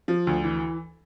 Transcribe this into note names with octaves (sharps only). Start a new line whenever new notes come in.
F3
D2
E3